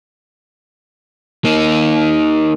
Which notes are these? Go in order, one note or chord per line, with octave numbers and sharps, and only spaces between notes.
A#3 D#4